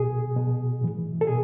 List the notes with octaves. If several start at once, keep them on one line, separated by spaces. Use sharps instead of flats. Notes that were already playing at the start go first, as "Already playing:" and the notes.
Already playing: B2 G#4
B2
A2 E3
A4
B2 G#4